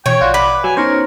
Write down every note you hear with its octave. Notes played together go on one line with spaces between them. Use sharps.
B2 E3 C#5 G5
A#1 F4 F#4 D5 F#5
B4 B5 D6
F#3 G#5 E6 G#6
B3 C#4 D#4 A#4 C5 C#5 C#6